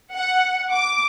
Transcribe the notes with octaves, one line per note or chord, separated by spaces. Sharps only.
F#5
D6